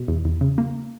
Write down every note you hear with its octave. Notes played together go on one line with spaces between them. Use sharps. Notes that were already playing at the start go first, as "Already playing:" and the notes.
Already playing: B2
E2
E2
C#3
A#3